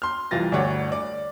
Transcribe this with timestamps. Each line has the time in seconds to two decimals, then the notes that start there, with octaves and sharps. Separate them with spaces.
0.02 C6 F6
0.31 C2 E3 F4 A6 A#6
0.52 G1 D2 A3 C#5 D5 F#5
0.92 D5